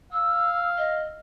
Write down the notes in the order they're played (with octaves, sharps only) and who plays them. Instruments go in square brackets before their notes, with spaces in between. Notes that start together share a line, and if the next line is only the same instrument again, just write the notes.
[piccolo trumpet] F5 [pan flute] E6
[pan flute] D#5